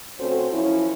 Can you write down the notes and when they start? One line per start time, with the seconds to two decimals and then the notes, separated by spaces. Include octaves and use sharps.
0.19 D2 C4 C#4 F#4 A4 C5
0.53 F#2 F3 C#4 E4